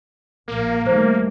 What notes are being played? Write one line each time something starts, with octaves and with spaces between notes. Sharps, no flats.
A#1 A#2 A#3
D#3 G3 A3 C5